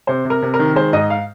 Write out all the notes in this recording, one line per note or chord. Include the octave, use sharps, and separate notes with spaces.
C3 C5
C3
A#4
C3
A#4
D#3
G#3 C5
G#2 D#5
F5